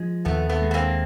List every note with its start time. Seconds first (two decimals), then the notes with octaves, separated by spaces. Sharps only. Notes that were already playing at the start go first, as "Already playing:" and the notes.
Already playing: F3 G#3
0.25 D#2 A3 B3
0.49 A3 B3
0.62 G#3
0.71 B3
0.74 A#3 C4